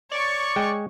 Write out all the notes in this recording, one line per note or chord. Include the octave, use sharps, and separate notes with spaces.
C#5 D5 C#6
G#3 G5